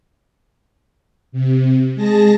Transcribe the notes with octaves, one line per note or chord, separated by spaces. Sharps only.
C3
G#3 G#4 A5 A#6